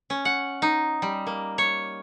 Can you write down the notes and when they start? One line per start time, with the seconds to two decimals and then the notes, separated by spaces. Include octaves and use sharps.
0.10 C#4
0.25 F#5
0.62 D#4
1.02 G3
1.27 A#3
1.58 C#5